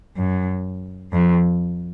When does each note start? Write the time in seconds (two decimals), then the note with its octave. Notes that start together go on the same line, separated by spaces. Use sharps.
0.17 F#2
1.12 F2